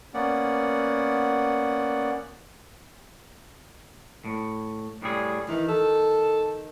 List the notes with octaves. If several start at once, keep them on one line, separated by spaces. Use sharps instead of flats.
A#3 B3 C#4 D5 F#5
A2
A2 G3 G#4
D#3 E3
A4